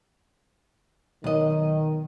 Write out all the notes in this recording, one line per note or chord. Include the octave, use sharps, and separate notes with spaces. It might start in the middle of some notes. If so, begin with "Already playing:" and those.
B1 D#3 D#5